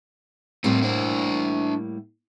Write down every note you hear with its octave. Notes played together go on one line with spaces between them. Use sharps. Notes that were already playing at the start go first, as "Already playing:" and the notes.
A2 G3 A3 A#3 C4
D4 C5